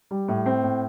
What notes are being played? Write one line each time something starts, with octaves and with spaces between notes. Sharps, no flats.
G3
A2
C4
A2